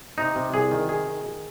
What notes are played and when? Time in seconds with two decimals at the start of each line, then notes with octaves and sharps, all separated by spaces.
0.18 C3 D#4
0.36 C3
0.53 C2 G#4
0.71 D#3
0.89 C3 G#4
1.07 D#3
1.24 D#3